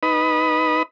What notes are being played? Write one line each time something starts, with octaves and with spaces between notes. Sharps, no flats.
D#4 B4 B5 D#6